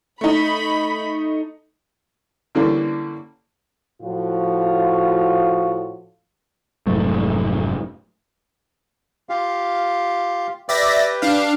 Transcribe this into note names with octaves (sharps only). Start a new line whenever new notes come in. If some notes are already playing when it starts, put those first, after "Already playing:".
A3 D#4 B5
D3 E3 G3 A#3 C#4
A2 F3 F4 F#4
F1 G#2 F#3 A3
F4 G4 F5
G4 B4 D5 E5 G5 A#6
D4 F5